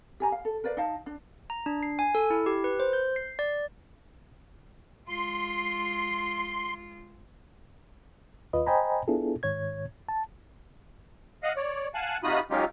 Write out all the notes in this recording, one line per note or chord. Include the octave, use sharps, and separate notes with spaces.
G4 G#5 A#5
F5
A4
A#4 B4 D5 F5
D#4 D#5 F5 A5
D4
A#5
D4
C7
G#5
A4
E4
G4
B4
C5
G6
C7
D5
G#3 F4 C6
D#2 F4 B4 D#5
C5 D#5 G5 G#5 A#5 B5
B3 D4 E4 F4 G#4 A4
G#2 D#3 C#5 G#6
A5
D#5 F5 F#5
C#5 D5
F5 F#5 G#5 A5 F#6
C3 D#4 F4 F#4 B5 D#6
F#3 G#3 C#4 D#4 F4 G4